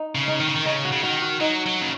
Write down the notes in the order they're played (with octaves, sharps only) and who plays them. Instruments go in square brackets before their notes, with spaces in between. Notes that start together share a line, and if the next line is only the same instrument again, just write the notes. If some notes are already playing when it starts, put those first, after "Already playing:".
Already playing: [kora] D#4
[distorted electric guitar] C#3
[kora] D#4
[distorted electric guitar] D#3
C#3
D#3
[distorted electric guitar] C#3 [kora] D#4
[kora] F#4
[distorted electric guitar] C#3
[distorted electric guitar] D#3 [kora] F#4
[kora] F#4
[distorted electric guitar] F#3 [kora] D#4
[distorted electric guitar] F#3
C#3